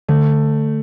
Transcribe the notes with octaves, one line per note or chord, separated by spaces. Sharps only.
D3 A3